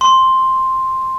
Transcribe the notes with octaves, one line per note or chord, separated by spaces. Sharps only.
C6